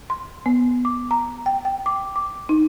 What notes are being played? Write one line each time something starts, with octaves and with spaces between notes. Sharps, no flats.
C6
B3
D6
A#5
G5
G5
D6
D6
D#4